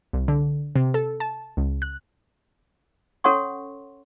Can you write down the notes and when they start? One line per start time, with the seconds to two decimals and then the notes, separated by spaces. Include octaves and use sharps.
0.13 C2
0.28 D3
0.76 C3
0.94 A4
1.20 A5
1.57 C#2
1.82 F#6
3.24 C#4 A4 C#5 F#5 C6 C#6